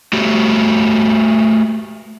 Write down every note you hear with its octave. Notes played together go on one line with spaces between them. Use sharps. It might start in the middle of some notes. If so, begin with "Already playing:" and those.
A3 F#4 G4